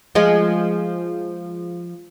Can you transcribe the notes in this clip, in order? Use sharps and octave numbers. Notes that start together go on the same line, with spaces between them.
F3 G#3